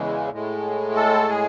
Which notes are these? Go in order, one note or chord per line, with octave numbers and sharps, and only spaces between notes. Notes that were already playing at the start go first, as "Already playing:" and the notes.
Already playing: E2 C#3 E3 G#3
A2 G#3
A4
G#4